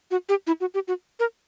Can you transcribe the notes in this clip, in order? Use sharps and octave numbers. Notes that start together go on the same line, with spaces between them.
F#4
G4
E4
F#4
G4
F#4
A#4